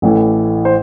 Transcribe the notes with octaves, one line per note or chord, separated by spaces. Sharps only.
A1 A2 E3
C5